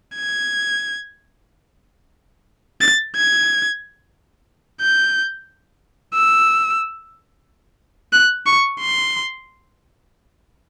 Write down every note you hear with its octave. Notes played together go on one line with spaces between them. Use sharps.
G#6
A6
G#6
G6
E6
F#6
C#6
C6